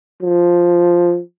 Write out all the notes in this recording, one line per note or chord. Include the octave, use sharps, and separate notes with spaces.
F3